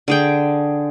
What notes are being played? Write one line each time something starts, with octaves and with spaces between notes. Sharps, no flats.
D3 G#4 G5